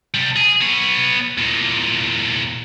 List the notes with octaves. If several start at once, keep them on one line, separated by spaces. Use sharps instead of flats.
C3 G3
G#4
B3 C#5
E2 A#2